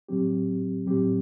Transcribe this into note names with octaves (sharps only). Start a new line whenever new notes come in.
A2 F#3 C4 G4
A2 F#3 C4 G4